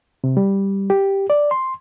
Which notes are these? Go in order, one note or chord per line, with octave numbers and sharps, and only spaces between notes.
C3
G3
G4
D5
C6